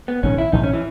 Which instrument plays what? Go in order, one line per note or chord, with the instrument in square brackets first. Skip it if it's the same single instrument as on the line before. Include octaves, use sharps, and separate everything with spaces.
[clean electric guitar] B3
[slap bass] A#1 G#2 D#3 [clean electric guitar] C#4
[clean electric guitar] E4
[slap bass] A#1 G#2 D#3 [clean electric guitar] D#4
[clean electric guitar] C#4
E3